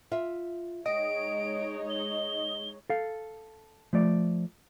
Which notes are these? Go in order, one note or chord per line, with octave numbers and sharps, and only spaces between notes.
F4 E5
G#3 D#4 C#5 D#5 G5 D7
G7
A4 F5
F3 A3 D5